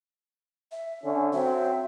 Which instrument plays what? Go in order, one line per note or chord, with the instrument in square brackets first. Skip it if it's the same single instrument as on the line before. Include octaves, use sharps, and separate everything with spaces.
[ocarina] E5
[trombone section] D3 C#4
[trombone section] F#3 C4 [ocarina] E5